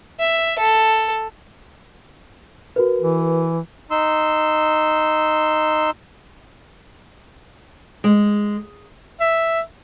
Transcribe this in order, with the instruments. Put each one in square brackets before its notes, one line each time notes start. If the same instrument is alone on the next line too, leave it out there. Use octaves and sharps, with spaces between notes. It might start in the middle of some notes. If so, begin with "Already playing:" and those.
[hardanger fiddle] E5
A4
[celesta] F#4 A#4 B4
[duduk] E3
[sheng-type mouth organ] D#4 C6 E6
[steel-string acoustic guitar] G#3
[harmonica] E5